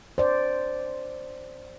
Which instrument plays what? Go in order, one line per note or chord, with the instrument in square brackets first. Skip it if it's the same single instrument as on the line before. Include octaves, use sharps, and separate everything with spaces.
[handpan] C5 D5